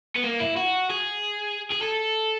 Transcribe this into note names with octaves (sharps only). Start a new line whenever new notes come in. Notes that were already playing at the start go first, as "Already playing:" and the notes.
B3
A#3
E4
F#4
G#4
G#4
A4